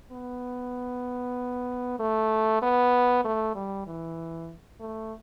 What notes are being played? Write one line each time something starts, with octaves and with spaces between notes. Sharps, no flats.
B3
A3
B3
A3
G3
E3
A3